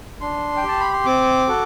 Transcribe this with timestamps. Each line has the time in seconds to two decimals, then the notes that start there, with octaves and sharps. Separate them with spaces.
0.21 D4 C6
0.57 G5
0.63 G4 A5
0.80 B5
0.93 C6
1.06 C4 D6
1.48 F#4 A4